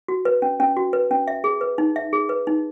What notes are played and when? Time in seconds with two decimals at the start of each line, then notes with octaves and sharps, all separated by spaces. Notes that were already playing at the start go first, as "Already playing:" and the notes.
0.08 F#4
0.25 B4
0.42 C#4
0.60 C#4
0.77 F#4
0.93 B4
1.11 C#4
1.28 E5
1.44 G#4
1.61 B4
1.78 D#4
1.96 E5
2.13 G#4
2.29 B4
2.47 D#4